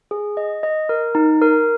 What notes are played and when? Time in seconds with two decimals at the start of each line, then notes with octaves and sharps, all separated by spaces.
0.11 G#4
0.37 D#5
0.63 D#5
0.89 A#4
1.15 D#4
1.42 A#4